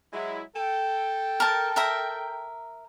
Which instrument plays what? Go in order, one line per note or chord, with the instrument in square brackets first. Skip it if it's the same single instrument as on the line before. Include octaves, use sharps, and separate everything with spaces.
[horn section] F#3 G#3 E4
A4 G5
[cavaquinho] A#4 A5
A#4 E5 A#5